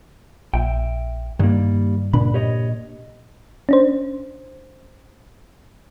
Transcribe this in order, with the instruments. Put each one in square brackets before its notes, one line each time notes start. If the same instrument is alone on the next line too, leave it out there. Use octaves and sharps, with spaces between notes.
[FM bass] A#1 [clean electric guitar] E5 G5
[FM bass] G2 [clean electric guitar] D#3 G3 A#3
[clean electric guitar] C#2 B5 [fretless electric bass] A#2 D4
[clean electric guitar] G4 C#5 D#5
[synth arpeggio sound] C#4 D4 C5